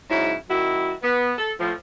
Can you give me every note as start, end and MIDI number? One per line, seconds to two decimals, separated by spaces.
0.10 0.35 44
0.10 0.35 49
0.10 0.35 54
0.10 0.35 64
0.49 0.92 42
0.49 0.92 51
0.49 0.92 64
0.49 0.92 66
1.02 1.33 59
1.38 1.52 69
1.60 1.73 45
1.60 1.73 53